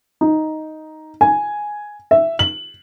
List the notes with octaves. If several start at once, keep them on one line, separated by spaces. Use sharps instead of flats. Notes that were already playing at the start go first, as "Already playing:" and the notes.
D#4
G#5
E5
F#7